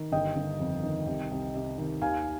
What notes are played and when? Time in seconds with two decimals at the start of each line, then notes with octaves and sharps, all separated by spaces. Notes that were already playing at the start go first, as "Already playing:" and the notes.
Already playing: D#3
0.12 G1 D#5 G5
0.36 G1
0.60 F2
0.83 D#3
1.07 C2
1.31 C2
1.55 C3
1.78 D#3
2.01 D#2 F5 G#5